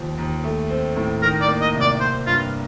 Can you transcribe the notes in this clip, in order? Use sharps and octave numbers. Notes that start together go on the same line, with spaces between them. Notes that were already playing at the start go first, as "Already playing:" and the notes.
Already playing: D#2 F3
D#2
A3
C4
A2
D#3 A#4
D5
A#3
D#5
C2
D5
C4 C5
G2 F4